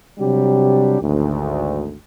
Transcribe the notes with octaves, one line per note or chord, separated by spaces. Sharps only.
C3 F#3 G3 D4 G4
G#1 D2